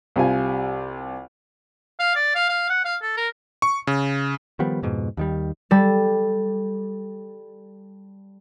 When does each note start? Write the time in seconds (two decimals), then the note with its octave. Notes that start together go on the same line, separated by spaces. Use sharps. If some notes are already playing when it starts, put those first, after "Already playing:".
0.16 C2 C3 F4 G#5
1.99 F5
2.16 D5
2.35 F5
2.49 F5
2.70 F#5
2.85 F5
3.02 A4
3.17 A#4
3.62 C#6
3.87 C#3
4.59 D#3 F3 G3 B3
4.83 F2 G#2 B2
5.17 D#2 D#3 G3
5.71 G3 A4